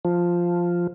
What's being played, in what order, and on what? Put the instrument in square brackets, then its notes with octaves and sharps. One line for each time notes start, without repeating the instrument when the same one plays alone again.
[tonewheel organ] F3